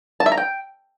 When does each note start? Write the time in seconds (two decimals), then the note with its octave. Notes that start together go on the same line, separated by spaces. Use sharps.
0.20 A5
0.26 E5
0.32 A#5
0.37 G5